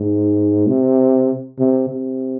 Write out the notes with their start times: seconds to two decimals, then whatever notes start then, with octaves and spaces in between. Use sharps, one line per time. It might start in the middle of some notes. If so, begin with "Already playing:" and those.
Already playing: G#2
0.67 C3
1.59 C3
1.90 C3